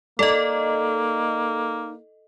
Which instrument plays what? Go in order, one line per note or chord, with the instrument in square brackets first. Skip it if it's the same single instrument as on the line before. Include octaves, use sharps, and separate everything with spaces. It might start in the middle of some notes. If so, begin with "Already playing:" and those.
[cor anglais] A#3 [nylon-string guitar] D#4 D5 A5 [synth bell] A4 D#5